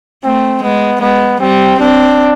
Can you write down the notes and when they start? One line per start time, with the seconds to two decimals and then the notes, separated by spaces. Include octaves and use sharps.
0.24 A3 C4
0.63 G#3 B3
1.01 G#3 B3
1.40 G3 C4
1.80 C4 D4